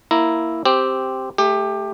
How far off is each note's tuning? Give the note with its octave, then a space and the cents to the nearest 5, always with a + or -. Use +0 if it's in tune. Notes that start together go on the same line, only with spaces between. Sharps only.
A#3 +0 E4 +0 A#5 +0
C4 +0 G4 +0
A3 -10 G4 +20